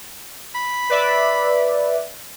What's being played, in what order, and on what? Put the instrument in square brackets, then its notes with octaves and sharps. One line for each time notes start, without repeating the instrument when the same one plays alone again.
[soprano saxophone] B5
[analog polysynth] B4 D5 E5